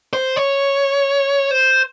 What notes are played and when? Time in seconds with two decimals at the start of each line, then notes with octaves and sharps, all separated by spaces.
0.13 C5
0.36 C#5
1.51 C5